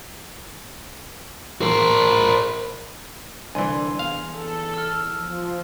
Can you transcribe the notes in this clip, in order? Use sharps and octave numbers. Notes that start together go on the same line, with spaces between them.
A#4 C5
C2 D3 E3 G#5 C6
E2 F5
A4
E6 F6
F3